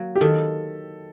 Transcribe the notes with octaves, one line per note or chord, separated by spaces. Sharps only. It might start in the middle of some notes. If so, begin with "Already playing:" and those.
Already playing: F#3 A#3
G4
D#3 A4